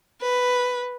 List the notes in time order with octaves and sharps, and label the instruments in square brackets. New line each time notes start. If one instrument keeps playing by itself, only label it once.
[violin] B4